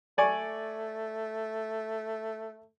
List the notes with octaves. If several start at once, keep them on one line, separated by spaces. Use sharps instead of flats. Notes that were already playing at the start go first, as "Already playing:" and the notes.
A3 D5 G#5 C#6